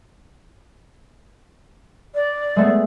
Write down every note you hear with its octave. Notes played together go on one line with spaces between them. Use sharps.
D5
G#3 A3 B3